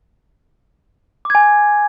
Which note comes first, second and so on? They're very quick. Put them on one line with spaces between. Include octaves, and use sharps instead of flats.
D6 G#6 G#5